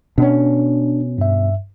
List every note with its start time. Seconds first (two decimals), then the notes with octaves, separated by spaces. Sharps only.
0.18 B2 C#4 D4
1.18 G2 E5